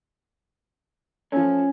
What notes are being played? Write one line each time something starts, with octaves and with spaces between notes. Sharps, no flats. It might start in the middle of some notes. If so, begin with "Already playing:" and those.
F3 A3 C#4